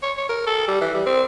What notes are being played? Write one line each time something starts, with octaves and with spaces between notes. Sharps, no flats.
C#5
C#5
A#4
A4
G3
E3
G3
C4